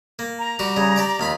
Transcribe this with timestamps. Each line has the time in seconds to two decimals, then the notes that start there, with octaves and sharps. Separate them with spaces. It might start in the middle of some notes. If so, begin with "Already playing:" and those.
0.19 A#3
0.39 A#5
0.59 G3 F#4 G4
0.76 C#3 G3
0.96 G4 D5 D6
1.19 D#2 F4 B5